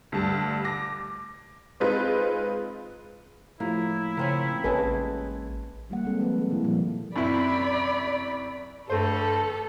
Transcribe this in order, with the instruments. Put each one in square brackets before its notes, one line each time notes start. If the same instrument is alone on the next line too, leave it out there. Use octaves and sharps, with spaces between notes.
[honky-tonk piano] D2 G2 G3 A5
D6 A#6
G#3 C4 D#4 F4 G#4 B4
[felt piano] A2 F3 [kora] A#3 [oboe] E4
[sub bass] C#3 [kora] A#3 C4 C#4
[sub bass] A1 [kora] C#3 G#3 [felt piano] B4 G#5 A5
[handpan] D#3 G3 A#3 F#5
G#3 C4 A4
F3 A#3 G4 B4
D#4 A4
C3 D#3 A#3 E4
A#2 F3 G3
[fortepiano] F#2 C3 E4 [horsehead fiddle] D5 B5
[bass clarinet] G2 [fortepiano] A3 C5 [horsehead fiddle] A4